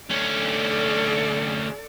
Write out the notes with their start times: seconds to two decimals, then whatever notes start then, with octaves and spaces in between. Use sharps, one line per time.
0.10 D2 C#4 A4 D5